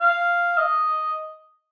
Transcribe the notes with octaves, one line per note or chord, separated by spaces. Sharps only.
F5
D#5